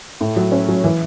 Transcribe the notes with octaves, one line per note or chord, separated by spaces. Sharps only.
A2
F#3
C#4
F#3
E3